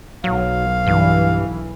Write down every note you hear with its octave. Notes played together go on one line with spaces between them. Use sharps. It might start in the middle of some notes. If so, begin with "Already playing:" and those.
B1 F#3 F5
G2 E3